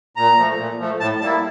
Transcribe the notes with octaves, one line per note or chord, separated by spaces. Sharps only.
A#2 A#5
F3 A3
A#2
F3 A3
A2 A5
G3 A#3 E4 A5